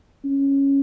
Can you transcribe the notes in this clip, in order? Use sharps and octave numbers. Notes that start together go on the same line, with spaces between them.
C#4